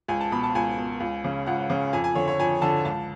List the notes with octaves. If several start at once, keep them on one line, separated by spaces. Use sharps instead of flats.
C#2 G#5
A5
B2 B5
A5
C#2 G#5
B2
C#2
C#3
C#2 F#5
C#3
F2 G#5
G#5
D3 C#5
C#5
F2 G#5
D3 A5
C#2 A5